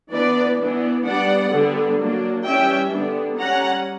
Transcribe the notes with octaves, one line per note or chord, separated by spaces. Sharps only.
E3 B3 D4 B4 D5
E3 B3 D4
G3 B3 D4 D5 F#5
D3 G3 B3 D4
F#3 A#3 D4
E3 G3 C#4 E5 G5
D3 G3 B3 D4
G3 C#4 F#5 A#5